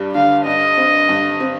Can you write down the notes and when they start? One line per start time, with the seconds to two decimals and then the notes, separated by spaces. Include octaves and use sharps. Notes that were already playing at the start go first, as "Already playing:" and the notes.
Already playing: G2 G3 D4
0.15 D3 F5
0.46 G2 D#5
0.77 C4
1.09 G2
1.40 C4